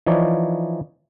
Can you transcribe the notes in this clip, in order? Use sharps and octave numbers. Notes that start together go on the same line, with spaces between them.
E3 F3 D#4 C#5 D5